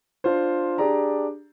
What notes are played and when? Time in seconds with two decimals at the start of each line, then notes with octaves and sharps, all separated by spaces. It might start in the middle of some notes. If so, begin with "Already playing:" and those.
0.24 D4 F4 C5
0.78 D4 G4 G#4 D5 A#5